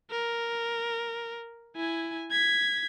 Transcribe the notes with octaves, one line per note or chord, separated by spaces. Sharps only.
A#4
E4 G#5
G#6 B6